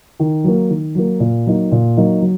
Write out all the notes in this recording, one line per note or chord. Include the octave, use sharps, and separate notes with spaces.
D#3
F#3 A#3
D#3
F#3 A#3
A#2
F#3 A#3 D#4
A#2
F#3 A#3 D#4
F#3